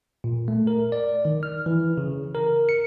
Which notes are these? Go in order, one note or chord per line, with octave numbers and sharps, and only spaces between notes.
A#2
A3
A#4
D5
D#3
F6
E3
C#3
A#4
C#7